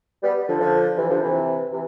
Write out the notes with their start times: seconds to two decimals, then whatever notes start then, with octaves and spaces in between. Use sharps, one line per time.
0.23 G3 B3
0.48 D3 F3
0.61 D3 F3
0.97 C3 E3
1.10 D3 F3
1.22 C3 E3
1.71 C3 E3